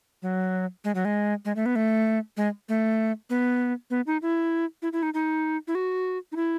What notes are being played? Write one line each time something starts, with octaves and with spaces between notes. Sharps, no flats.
F#3
G#3
F#3
G#3
G#3
A3
B3
A3
G#3
A3
B3
B3
D#4
E4
E4
E4
D#4
D#4
E4
F#4
D#4
E4